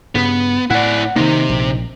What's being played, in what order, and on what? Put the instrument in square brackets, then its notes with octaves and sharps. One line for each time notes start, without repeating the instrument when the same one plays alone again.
[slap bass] G2 C#3 [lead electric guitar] B3
[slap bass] A2 [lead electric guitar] E4 D5 [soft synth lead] F#5
[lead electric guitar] C3 [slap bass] D#3 A#3 [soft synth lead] D#4
[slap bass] A#1